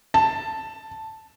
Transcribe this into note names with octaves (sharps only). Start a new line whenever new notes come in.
A5